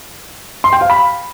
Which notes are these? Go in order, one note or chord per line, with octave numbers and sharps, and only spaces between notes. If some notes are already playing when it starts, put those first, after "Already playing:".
C6
G5
F5
B5